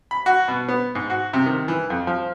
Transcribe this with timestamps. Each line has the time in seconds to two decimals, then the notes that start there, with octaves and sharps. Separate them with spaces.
0.11 B5
0.26 F#4
0.48 B2
0.68 B3
0.95 G#2
1.10 F#4
1.33 C3
1.46 D#3
1.68 E3
1.90 F2
2.07 F3